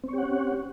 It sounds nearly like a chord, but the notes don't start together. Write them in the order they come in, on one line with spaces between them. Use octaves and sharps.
C4 C#5 G4 F#5 C#4